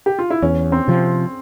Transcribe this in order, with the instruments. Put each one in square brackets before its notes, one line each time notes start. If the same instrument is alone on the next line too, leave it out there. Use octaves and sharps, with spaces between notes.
[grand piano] G4
F4
E4
[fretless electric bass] E2 [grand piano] C#4
[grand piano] C4
[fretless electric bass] C3 F3